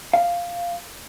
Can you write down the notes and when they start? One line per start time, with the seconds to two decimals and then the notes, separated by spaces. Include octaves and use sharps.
0.14 F5